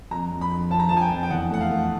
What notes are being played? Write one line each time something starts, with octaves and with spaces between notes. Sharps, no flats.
F2 A#5
F2
B5
F2
F3 A5
A#5
F3 A5
G#5
G5
F2
G5
E2 F#5
A3 F#5
F5
A3